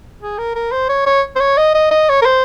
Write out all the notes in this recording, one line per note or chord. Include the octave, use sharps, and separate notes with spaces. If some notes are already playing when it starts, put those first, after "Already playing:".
G#4
A#4
A#4
C5
C#5
C#5
C5
C#5
D#5
D#5
D#5
C#5
A#4
C5